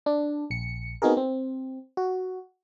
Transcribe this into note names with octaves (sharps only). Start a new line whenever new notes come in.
D4
A#1 C#7
B3 C4 D#4 F#4 G#4 A#4
C4
F#4